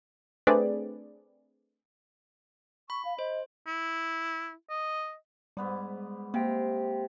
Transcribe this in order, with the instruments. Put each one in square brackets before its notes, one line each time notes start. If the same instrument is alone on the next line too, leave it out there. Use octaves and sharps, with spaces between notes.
[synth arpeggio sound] A3 C4 D4 G#4 B4 D5
[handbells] B5 [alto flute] C#6
[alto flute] F5
[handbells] C5 [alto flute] D#5
[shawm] E4
D#5
[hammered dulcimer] G#2 B3 D6 [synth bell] G3
[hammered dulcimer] C3 [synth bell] A#3 G5